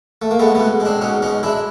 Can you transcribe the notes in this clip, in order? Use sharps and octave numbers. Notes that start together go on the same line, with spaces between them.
A3
A#3
G#3 A3 B3
B2 A3 B3
G#3
C4 D4
B2 C#4 D#4
G#3 C#4 D#4
G#3 D4 E4